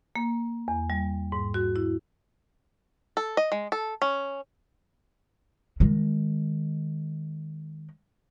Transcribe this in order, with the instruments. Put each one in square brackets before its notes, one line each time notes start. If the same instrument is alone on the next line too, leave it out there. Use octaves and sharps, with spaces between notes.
[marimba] A#3
E2
G3
G#2
F#4
E4
[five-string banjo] A4
D#5
G#3
A4
C#4
[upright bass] D#3 G#3